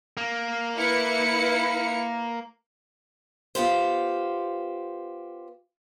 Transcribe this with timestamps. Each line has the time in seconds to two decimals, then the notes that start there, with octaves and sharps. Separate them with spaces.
0.17 A#3
0.77 E4 B4 C#7
3.55 B3 F4 G4 C5